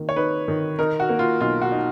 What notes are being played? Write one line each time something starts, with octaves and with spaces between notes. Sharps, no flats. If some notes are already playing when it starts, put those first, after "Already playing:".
Already playing: D#3 A#3
C#5
D#4 B4
D#3
D#4 A#4
F#4
A#3
F4
B1 F4
F#4
D#4